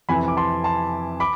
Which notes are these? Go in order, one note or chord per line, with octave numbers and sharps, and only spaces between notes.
F2 C3 E3 G#5 B5
D6
A5 C6
A5 C6
B5 D6